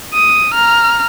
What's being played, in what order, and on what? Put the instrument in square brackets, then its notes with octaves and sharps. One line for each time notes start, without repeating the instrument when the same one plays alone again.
[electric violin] D#6
A#5 F6